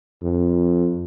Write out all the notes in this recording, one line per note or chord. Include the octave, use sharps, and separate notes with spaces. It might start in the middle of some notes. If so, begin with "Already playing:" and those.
F2